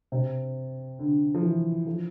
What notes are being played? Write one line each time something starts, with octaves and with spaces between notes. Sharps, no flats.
C3
D3
F3
E3
F3